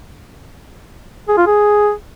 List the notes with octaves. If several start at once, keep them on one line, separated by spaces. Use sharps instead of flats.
G#4
F4
G#4